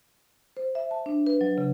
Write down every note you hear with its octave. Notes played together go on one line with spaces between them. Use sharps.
C5
E5
A5
D4
B4
F#3
C#3